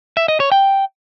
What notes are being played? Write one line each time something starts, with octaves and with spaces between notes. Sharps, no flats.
E5
D#5
C#5
G5